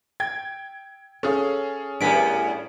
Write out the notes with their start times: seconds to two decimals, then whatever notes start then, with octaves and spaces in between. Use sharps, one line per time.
0.20 G5 G#6
1.23 C#4 G#4 A4 F5
2.01 A2 G3 B3 D4 A#4 G#5 B6 D7